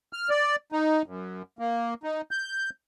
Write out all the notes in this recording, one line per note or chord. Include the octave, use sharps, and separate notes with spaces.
F6
D5
D#4
F#2
A#3
D#4
G6